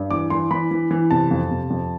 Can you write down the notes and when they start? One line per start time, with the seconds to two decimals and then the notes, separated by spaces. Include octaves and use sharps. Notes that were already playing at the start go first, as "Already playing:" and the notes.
Already playing: G2
0.11 E3 D6
0.30 E3 C6
0.51 E3 B5
0.71 E3
0.91 E3
1.11 C3 A5
1.31 F2
1.51 C3
1.70 F2